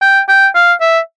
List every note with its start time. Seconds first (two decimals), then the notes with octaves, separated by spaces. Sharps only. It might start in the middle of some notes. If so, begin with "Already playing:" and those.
0.02 G5
0.29 G5
0.55 F5
0.81 E5